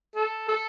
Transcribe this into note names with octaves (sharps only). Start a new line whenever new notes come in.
A4
A4